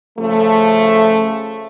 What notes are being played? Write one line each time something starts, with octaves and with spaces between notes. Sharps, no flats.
C#3 F3 A3